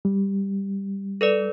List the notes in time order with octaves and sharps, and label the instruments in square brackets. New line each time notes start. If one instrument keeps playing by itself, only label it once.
[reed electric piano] G3
[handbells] A4 B4 D5